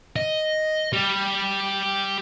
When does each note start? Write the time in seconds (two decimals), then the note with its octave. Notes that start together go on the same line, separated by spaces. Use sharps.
0.16 D#5
0.93 G3